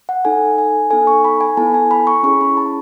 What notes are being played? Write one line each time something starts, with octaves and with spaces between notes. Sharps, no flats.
F#5
D#4 A4 G#5
G#5
B3 D#4 A4 G#5
C#6
B5
G#5
B3 E4 A4 A5
G#5
B5
C#6
C#4 E4 G#4 C#6
B5
A5